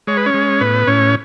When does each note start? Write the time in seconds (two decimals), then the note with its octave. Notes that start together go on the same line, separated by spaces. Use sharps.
0.07 G#3 C#5
0.17 B4
0.26 C#4 C#5
0.34 G#3
0.61 A2 B3 B4
0.87 A2 C#4 C#5